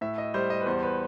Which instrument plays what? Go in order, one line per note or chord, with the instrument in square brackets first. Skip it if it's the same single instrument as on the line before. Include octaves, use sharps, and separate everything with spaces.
[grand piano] A2 E5
D#5
G3 C5
D#5
B4
E2 C5
B4